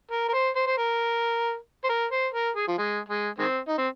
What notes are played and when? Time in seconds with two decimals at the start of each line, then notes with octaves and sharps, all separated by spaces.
0.12 A#4
0.29 A#4
0.33 C5
0.56 C5
0.67 C5
0.78 A#4
1.84 C5
1.89 A#4
2.12 C5
2.34 A#4
2.56 G#4
2.68 F3
2.78 G#3
3.09 G#3
3.38 D#3 G#3 C4
3.68 D#4
3.78 C4